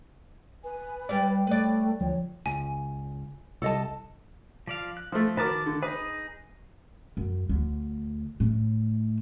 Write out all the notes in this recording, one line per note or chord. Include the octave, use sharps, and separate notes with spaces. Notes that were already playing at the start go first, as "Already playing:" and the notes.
B4 G#5
G3 D5 G5
A3 B4 D5
D2 F3 C#5
C#2 G#5
C2 A4 D#5 A5
F3 D5 F5
F#6
F3 A3
D#3 F#4 A#4 B4 A5 D6
D3
D#4 G#4 B4
F#2
D2
A2